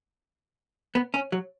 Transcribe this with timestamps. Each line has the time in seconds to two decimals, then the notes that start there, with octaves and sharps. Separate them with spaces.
0.95 B3
1.14 C#4
1.32 F#3